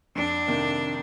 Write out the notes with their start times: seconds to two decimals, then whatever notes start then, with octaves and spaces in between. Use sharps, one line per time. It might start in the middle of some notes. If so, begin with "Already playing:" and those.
0.15 F2 D4
0.47 C3 D#3 A#3